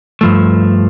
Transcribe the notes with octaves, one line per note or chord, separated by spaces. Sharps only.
G2 F3 A3